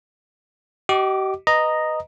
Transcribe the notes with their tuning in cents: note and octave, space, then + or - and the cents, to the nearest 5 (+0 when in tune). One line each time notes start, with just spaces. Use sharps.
G4 -40 D#5 +0 D6 +0
B4 +0 D#5 -5 A#5 +0